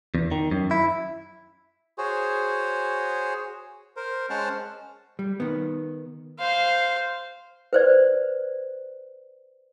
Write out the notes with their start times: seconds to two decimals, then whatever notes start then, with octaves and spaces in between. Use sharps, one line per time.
0.15 E2
0.32 D#3
0.51 F#2
0.71 E4
1.98 F#4 G#4 C5 C#5
3.96 A#4 C5
4.30 G#3 C#4 C5 F#5 A5 F6
5.19 G3
5.40 D#3 B3
6.39 C5 F5
7.73 B4 C5 D5